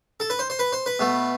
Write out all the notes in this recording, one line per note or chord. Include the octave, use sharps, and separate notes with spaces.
A4
B4
C5
C5
B4
C5
B4
B2 A3